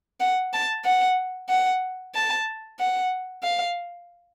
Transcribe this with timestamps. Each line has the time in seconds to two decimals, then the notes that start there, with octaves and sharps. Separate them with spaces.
0.20 F#5
0.53 A5
0.85 F#5
1.49 F#5
2.15 A5
2.79 F#5
3.43 F5